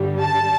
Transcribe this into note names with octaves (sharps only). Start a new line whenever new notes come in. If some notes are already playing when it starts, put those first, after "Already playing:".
Already playing: G2 D3 G3
A5